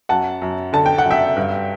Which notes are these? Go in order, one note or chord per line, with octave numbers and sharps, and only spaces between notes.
F#2 F#5 A5
F#2
D3 A5
G5
F#5
F#2
E5 G5
G2